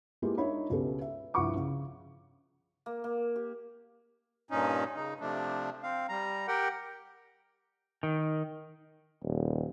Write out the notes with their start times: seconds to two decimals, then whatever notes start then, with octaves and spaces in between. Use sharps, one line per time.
0.22 G#3 A#3 E4 F4 G4 B4
0.37 D4 D#4 A#4 C#5 E5 B5
0.69 C#2 B2 C#4 G4 A4 B4
1.01 E5
1.34 C2 G2 F3 F#5 C#6 D6
1.56 C#3
2.86 A#3
3.04 A#3
3.36 G4
4.51 G2 A#2 C#4 D#4
4.95 C#3 D#4
5.21 C3 F3 A3 D4
5.83 C4 F5
6.09 G3 A#5
6.48 G4 A#4 F#5 G5
8.03 D#3
9.23 D#1